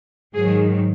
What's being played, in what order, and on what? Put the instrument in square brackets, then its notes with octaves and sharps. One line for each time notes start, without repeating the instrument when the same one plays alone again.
[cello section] G#2 D#3 F#3 G#4